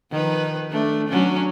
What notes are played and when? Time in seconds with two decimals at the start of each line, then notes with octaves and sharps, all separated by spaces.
0.11 D#3 F3 B4
0.71 A3 D4
1.08 F#3 C#4 D4